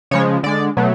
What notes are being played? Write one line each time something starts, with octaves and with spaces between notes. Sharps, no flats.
C#3 F3 G#3 C#5
D3 G#3 D5
B2 F#3 A3